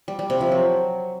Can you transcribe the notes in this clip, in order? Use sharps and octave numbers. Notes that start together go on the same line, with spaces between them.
G3
G3
C3
F3
F#3